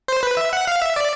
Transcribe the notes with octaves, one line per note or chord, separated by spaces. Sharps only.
C5
B4
E5
F#5
F5
E5
D5